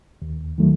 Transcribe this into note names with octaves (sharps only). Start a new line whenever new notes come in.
D#2
D#3 F#3 A3